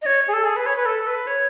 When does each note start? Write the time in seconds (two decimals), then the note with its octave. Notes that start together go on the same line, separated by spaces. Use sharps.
0.02 D#5
0.06 C#5
0.28 G#4
0.33 A4
0.46 G#4
0.56 B4
0.66 C#5
0.76 B4
0.86 A4
1.07 B4
1.27 C#5